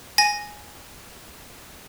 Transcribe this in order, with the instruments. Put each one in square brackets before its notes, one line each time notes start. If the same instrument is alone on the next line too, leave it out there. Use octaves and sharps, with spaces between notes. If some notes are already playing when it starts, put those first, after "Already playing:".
[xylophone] G#5 A#6